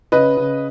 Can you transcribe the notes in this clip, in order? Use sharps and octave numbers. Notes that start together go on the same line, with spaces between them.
C#3 B4 D#5
C#3